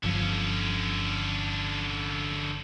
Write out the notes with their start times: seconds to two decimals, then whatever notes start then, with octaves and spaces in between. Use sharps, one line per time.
0.04 G1 D3 F3 C#4